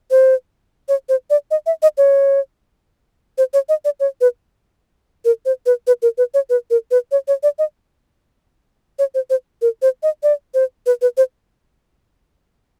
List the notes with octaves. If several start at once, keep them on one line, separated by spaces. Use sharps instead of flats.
C5
C#5
C5
D5
D#5
E5
D#5
C#5
C5
C#5
D#5
D5
C#5
B4
A#4
C5
B4
B4
A#4
B4
C#5
B4
A#4
B4
C#5
C#5
D5
D#5
C#5
C5
C5
A#4
C5
D#5
D5
C5
B4
B4
C5